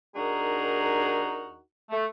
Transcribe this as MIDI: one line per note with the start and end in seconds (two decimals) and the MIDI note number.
0.15 1.58 39
0.15 1.58 62
0.15 1.58 63
0.15 1.58 66
0.15 1.58 68
0.15 1.58 70
1.91 2.05 57